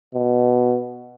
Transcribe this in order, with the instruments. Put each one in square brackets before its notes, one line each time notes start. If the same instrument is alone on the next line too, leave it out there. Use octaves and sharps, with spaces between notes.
[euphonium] B2